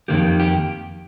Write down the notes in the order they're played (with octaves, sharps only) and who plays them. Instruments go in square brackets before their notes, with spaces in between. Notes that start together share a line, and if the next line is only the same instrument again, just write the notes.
[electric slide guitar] F2 C3 D#3 A#3 G4
G4